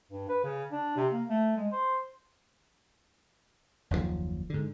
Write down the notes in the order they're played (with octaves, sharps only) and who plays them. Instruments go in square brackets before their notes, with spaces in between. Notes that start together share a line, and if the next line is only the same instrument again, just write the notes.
[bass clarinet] G2
B4
C#3
D4
C3
A#3
A3
G#3
C5
[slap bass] F#1 D#2 A2 F3
G#2 D3